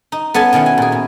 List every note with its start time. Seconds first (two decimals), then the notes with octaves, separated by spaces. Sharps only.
0.12 D#4
0.34 B3 C#4 A4 G#5 A5
0.53 B2 D#3 C#4 E4 F#5
0.66 G#5
0.78 A#2 G#4
0.92 B2